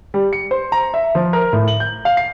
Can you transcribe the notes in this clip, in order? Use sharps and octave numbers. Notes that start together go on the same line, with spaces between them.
G3
C#7
C5
A#5
E5
F3
A#4
A2
F#7
G6
F5
C7